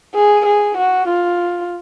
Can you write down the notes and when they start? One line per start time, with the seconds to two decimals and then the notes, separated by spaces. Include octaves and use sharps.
0.15 G#4
0.46 G#4
0.77 F#4
1.08 F4